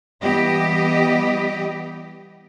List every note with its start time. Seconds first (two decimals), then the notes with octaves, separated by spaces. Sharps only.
0.23 E3 G3 B3 G4 D#5